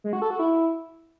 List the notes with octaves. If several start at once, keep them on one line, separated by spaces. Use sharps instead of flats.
G#3
F#4
A4
F#4
E4